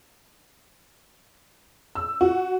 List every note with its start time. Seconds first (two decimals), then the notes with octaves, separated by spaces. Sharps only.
1.95 E6
2.21 F#4